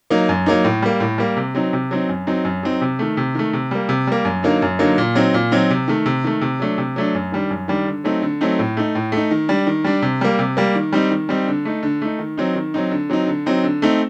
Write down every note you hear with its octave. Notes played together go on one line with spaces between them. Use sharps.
F#3 A#3 D#4
F#2
F#3 A#3 D#4
A2
G3 A#3
A2
G3 A#3
C3
F#3 C4 D#4
C3
F#3 C4 D#4
F#2
F#3 C4 D#4
F#2
F#3 C4 D#4
C3
D#3 A3
C3
D#3 A3
C3
G3 A#3
C3
G3 A#3
F#2
D3 F#3 A#3 D#4
F#2
D3 F#3 A#3 D#4
A#2
F#3 C4 D#4
A#2
F#3 C4 D#4
C3
D#3 A3
C3
D#3 A3
C3
F#3 A3 D4
C3
F#3 A3 D4
F#2
D#3 G3 D4
F#2
D#3 G3 D4
D3
F#3 A3 C4 D#4
D3
F#3 A3 C4 D#4
A2
A3 D#4
A2
A3 D#4
D#3
G3 D4
D#3
G3 D4
C3
G3 A#3
C3
G3 A#3
D#3
G3 C4 D#4
D#3
G3 C4 D#4
D3
A3 D#4
D3
A3 D#4
D#3
F#3 C4 D#4
D#3
F#3 C4 D#4
D3
F#3 C4 D#4
D3
F#3 C4 D#4
D3
A3 C4 D#4